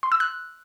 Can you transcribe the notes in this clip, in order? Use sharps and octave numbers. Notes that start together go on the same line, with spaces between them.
C6
E6
F#6